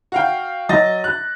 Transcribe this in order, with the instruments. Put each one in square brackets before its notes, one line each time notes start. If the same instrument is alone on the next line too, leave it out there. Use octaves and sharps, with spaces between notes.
[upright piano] F#4 F5 G5
F#3 D#5 A6 A#6
F#6